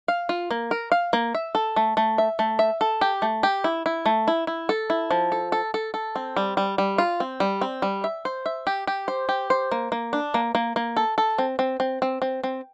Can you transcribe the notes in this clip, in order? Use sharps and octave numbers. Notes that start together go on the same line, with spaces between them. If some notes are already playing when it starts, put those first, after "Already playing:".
F5
F4
A#3
A#4
F5
A#3
E5
A4
A3
A3
E5
A3
E5
A4
G4
A3
G4
E4
E4
A3
E4
E4
A4
E4
F3
A4
A4
A4
A4
C4
G3
G3
G3
F4
C4
G3
C4
G3
E5
C5
E5
G4
G4
C5
G4
C5
A#3
A#3
D4
A#3
A#3
A#3
A4
A4
C4
C4
C4
C4
C4
C4